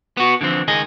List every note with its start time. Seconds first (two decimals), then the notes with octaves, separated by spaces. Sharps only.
0.17 B3 F#4
0.41 D3 E3 F3 C4
0.68 C#2 D#3 G#4 D#5